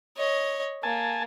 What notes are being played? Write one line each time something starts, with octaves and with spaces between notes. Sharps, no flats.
C#5 D#5
A#3 G#5 A5